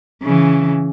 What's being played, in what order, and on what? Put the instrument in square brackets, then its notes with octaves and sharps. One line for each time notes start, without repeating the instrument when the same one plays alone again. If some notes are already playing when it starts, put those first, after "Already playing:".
[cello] C#3 E3